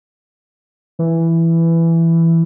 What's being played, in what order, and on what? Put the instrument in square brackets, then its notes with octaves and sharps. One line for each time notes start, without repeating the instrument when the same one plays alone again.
[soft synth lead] E3